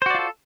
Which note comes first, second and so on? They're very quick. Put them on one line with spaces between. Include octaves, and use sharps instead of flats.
C5 F#4 D5 F4 A4